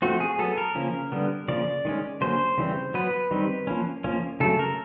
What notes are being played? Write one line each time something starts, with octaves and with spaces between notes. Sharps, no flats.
F3 A3 C4 F#4
G#4
F#3 B3 A4
A#4
C#3 F3 A#3 C#4
D3 G3 B3
C#3 F3 A#3 D5
D#3 G#3 C#4
D3 F#3 A#3 C#4 C5
C#3 E3 G3 C4
F#3 B3 B4
D#3 G3 C4
F3 A#3 C#4
F3 A#3 C#4
C#3 F#3 A3 A4
A#4